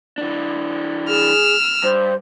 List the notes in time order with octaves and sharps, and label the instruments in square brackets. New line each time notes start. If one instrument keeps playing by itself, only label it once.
[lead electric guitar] E3 D4
[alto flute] G#4 [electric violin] E6 F6
[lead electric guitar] G2 [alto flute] C5